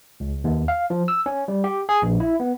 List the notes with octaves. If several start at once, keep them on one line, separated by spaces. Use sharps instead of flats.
C#2
D#2
F5
F3
E6
C#4
G3
G4
G#4
A#1
E4
B3